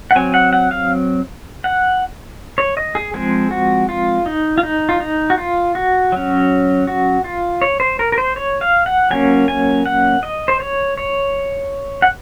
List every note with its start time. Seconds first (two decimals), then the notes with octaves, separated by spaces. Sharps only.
0.11 F#5
0.15 F#3 C4 G#5
0.34 F#5
0.53 F#5
0.71 F5
1.64 F#5
2.58 C#5
2.77 D#5
2.95 G#4
3.14 F3 G#3 C4 G#4
3.51 F#4
3.89 F4
4.26 D#4
4.58 F4
4.63 D#4
4.89 F4
5.00 D#4
5.30 F#4
5.38 F4
5.75 F#4
6.12 F#3 C#4
6.87 F#4
7.24 F4
7.62 C#5
7.80 C5
7.99 A#4
8.12 A#4
8.18 C5
8.36 C#5
8.61 F5
8.86 F#5
9.11 F#3 A#3 C#4 G#5
9.48 G#5
9.86 F#5
10.23 D#5
10.48 C5
10.60 C#5
10.98 C#5
12.02 F#5